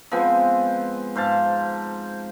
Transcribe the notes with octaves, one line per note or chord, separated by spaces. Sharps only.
F3 G#3 B3 C4
G#2 C5 F5 A5